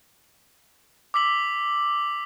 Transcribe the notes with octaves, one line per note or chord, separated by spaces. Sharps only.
D6 E6 B6 F#7